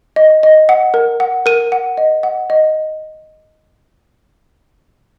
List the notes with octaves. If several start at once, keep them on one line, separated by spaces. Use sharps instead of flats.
D#5
D#5
F#5
A#4
F#5
A#4 D#7
F#5
D#5
F#5
D#5